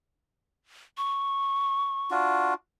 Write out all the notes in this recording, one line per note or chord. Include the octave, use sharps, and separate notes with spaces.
C#6
D4 F4 F#4